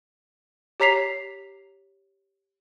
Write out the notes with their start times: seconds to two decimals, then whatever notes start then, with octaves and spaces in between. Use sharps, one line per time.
0.80 G4 C#5 A#5 B6 C7 F7